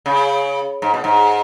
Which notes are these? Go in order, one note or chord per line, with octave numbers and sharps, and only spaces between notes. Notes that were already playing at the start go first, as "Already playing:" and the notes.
C#3
G#2
B2
G#2